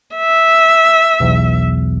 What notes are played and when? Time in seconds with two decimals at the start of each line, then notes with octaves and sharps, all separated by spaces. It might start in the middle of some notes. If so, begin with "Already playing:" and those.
0.16 E5
1.20 B1 E2